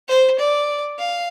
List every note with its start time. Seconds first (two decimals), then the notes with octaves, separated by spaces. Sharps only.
0.08 C5
0.39 D5
0.98 F5